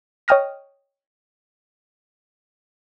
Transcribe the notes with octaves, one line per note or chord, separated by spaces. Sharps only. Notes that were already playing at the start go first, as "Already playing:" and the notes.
C#5 D#5 G5 D#6 F6 A#6